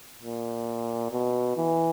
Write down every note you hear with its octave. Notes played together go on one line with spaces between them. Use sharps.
A#2
B2
E3